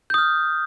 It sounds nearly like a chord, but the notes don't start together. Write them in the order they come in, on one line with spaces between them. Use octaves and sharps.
G6 D#6 F6